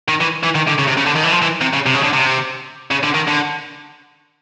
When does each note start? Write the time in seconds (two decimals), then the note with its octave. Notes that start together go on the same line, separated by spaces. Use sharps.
0.08 D#3
0.21 E3
0.43 E3
0.55 D#3
0.68 D3
0.79 C#3
0.88 C3
0.97 C#3
1.06 D3
1.15 D#3
1.23 E3
1.32 F3
1.42 E3
1.61 C3
1.73 C#3
1.86 C3
1.94 C#3
2.03 D3
2.13 C3
2.91 C#3
3.03 D3
3.15 D#3
3.28 D3